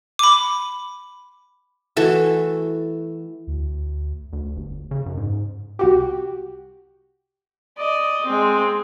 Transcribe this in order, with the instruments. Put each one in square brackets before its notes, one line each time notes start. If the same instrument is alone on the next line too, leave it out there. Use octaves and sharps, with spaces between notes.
[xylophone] B5 D6
[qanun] E3 A3 F#4 A4
[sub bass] D2
[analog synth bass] D2
G1
C#3
F#2
G#2
[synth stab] C2 F#4 G4
[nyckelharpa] D5 D#5
G#3 C4